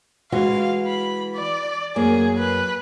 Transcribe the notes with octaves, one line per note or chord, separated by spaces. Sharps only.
E3 G#3 F#4 F5
B5
D5
F#2 A#3 G#4
B4